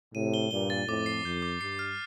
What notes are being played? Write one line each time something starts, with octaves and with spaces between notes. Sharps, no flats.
A2 C3 D#7
G7
G2 A#2 G7
A6
F2 A2 D6
C7
F2 G6
D6
G2 C7
F6